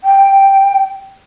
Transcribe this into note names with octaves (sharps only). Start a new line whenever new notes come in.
G5